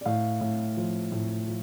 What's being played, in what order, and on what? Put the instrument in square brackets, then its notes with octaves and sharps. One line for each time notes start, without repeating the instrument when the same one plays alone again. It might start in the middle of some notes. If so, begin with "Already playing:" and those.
[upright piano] D5
A2 F5
A2
F3
A2
F3